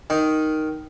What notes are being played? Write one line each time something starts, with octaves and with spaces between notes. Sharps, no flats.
D#3